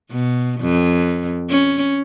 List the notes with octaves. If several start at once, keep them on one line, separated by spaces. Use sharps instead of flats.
B2
F2
C#4